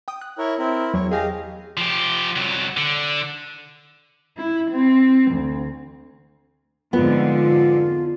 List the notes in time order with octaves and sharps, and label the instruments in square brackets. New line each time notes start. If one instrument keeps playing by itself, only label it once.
[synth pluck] G5 D#6
F#6
[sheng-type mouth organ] E4 A#4 C#5
C4 E4 A#4
[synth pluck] E2 F#3 [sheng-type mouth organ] C#5
[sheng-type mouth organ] G4 D#5 F5 [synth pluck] G#4 G#5 A#6
[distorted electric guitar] F3 G4
C2 F#3
D3
[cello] E4
C4
D2
[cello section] F2 G#2 D3 [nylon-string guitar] B3 [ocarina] F4